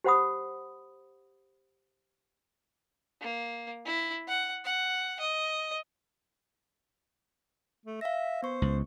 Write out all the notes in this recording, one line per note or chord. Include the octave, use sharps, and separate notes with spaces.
G4 C5 F#5 B5 D#6
A#3
E4
F#5
F#5
D#5
A3
E5 F5 A#6
B3 C5 C#6
C#2